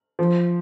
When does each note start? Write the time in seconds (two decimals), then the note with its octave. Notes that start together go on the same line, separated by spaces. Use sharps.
0.19 F3